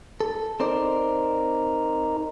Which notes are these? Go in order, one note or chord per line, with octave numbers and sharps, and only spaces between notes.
A4
C4 D#4 A#4 C5 D5